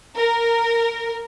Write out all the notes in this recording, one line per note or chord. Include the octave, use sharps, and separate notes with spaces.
A#4